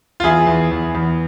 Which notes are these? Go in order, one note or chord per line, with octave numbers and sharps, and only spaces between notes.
F4
E2 E4 G#4
E2
E2
E2